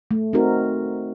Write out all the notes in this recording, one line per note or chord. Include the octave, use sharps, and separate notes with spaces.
A3
C4 D#4 F#4 A#4